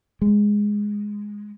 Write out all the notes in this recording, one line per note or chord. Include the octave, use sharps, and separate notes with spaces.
G#3